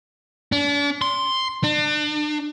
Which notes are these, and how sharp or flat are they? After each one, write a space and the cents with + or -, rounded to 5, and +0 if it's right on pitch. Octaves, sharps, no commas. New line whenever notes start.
D4 -40
C6 +0
D4 +35